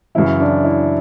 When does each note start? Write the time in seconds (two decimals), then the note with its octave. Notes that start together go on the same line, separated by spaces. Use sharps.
0.15 F#2 C#3 E3 E4
0.40 D4
0.64 E4